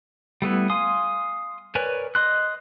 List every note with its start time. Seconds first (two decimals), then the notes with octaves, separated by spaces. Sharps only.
0.42 G3 A3 B3 E4
0.70 F5 G#5 C6 D#6
1.75 A#4 B4 C#5 D5 G#5
2.15 D#5 C6 F#6